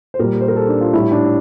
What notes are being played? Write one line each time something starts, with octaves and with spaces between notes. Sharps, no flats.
C5
A#2 G3 A#4
C5
A#4
A4
D4
F4
A2 G3 E4
D4